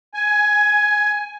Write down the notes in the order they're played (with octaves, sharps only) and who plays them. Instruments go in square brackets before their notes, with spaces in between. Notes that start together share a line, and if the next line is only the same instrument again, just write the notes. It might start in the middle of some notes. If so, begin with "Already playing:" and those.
[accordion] G#5